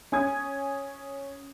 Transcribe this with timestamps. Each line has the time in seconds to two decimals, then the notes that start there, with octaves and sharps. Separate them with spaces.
0.12 C#4 G#5 D#6 G#6